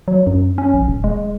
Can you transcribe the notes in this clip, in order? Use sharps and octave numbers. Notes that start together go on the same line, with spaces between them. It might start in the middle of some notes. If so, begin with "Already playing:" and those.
F#3
F#2
C#4
A#1
D#1
G#3